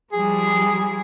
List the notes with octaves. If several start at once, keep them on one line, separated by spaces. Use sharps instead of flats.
F3 G3 G#4